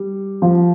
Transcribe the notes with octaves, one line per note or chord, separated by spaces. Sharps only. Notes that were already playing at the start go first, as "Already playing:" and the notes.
Already playing: G3
F3